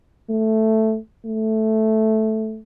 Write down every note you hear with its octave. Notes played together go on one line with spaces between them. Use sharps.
A3
A3